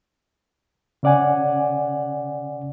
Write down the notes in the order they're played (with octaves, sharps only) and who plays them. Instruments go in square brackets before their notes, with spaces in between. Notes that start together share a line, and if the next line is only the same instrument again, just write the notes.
[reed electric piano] C#3 C#4 D5 F#5 G#5